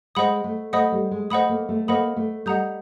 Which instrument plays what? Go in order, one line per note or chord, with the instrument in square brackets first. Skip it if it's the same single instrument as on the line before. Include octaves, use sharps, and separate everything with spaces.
[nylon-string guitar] G#3 [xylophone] C5 D#5 F#5 B5 D#6
[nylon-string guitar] A3
[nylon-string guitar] A3 [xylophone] C5 D#5 F#5 B5 D#6
[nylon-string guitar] G3
G#3
[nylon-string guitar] A3 [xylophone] C5 D#5 F#5 B5 D#6
[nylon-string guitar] A#3
A3
[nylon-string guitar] A#3 [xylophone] C5 D#5 F#5 B5 D#6
[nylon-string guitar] A3
[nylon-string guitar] G3 [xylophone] D#5 F#5 A#5 D#6 G6